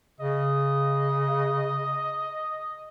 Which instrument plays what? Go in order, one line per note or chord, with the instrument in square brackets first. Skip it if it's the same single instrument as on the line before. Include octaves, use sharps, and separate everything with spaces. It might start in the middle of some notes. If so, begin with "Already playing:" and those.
[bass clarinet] C#3 [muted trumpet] D#5